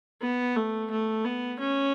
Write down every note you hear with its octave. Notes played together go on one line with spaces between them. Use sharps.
B3
A3
A3
B3
C#4